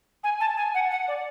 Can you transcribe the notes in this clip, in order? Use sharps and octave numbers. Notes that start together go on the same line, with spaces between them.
G#5
A5
G#5
F#5
F#5
D5